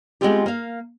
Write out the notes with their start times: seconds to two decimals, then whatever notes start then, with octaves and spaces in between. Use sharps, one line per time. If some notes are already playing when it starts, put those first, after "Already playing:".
0.21 G#3 A3 B3 C4 F4 G4
0.46 A#3 F5